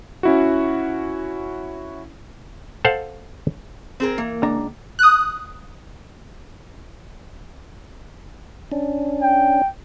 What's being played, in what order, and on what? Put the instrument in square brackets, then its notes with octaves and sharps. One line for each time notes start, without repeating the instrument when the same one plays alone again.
[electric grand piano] C#4 E4 F#4
[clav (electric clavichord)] A4 C5 F5 F#5 A5
[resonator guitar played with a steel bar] C4 G#4 A#4
[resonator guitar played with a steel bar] E3 [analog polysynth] A#3
[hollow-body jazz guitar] C#2 D4 A#5
[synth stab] D#6 F#6
[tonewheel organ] C#4 D4
[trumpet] G5